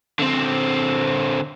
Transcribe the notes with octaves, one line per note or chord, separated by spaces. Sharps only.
D3 C4